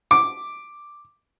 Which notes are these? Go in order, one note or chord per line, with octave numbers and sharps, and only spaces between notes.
D6